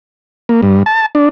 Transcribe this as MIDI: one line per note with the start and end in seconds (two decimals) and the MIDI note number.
0.49 0.61 58
0.63 0.83 43
0.86 1.06 81
1.15 1.29 62